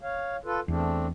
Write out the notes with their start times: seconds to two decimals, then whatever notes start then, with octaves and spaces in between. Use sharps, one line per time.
0.01 C#5 F5
0.45 F4 A4 B4
0.68 E2 A3 C4 D4